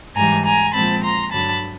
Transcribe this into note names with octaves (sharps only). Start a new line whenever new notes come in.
G#2 E3 G3 G#5 A#5
G#5 A#5
A#2 F3 G#3 C4 A5 B5
A#5 C6
G2 D3 F#3 A5 B5